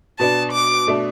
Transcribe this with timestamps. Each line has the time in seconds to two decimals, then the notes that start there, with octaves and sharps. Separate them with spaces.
0.19 B2 B3 D4 A5
0.52 D6
0.87 B2 A3 D4